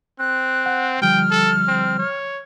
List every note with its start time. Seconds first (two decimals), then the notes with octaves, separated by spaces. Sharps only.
0.19 C4 F#6
0.66 F#5
1.02 D3 F3 G3 G5 F6
1.31 A4
1.68 C4
1.99 C#5